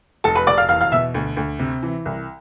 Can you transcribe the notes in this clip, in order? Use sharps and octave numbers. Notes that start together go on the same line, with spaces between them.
F1 A4 A5
B4 B5
F1 D5 D6
F5 F6
E2 F5 F6
F5 F6
B2 E5 E6
D2
D2
C3
E3
C2